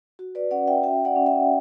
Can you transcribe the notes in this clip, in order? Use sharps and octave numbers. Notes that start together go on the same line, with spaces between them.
F#4
B4 D5
C#4 D5 F#5
E5 G5
F#4 E5 G5
D5 F#5
C#4
E5 G5